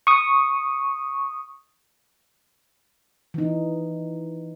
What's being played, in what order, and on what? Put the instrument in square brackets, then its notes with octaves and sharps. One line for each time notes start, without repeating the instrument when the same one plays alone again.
[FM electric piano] C#6 D#6
[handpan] E3 D#4